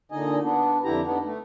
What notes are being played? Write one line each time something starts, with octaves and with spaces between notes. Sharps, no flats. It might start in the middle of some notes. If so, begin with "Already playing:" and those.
A#2 D3 D#4 D#5 G#5
B3 D4
F2 D3 E4 G4 A#5
B3 D4 D#4
A3